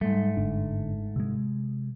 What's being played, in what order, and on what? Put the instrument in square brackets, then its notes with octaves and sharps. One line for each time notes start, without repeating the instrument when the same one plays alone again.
[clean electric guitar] G#2 A3 [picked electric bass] G3
[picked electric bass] G1 D4
C3 G#3